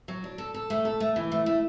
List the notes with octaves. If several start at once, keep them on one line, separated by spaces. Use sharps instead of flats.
F#3
D4
A4
A4
A3
A4
A3
E3
A3
A3